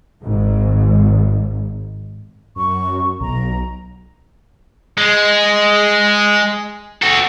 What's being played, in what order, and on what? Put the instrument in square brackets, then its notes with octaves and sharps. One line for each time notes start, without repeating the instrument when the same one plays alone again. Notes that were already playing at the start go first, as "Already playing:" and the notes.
[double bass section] G#1 G#2
[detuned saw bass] F#2 [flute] C#6
[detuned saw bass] B1 [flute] A#5
[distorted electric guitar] G#3
F#4 A4